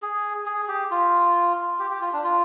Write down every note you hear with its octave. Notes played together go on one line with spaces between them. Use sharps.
G#4
G#4
G4
F4
G4
G4
F4
D4
F4